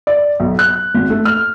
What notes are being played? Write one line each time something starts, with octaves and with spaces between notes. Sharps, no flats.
D5
B1
F#6
G#1
A3
F6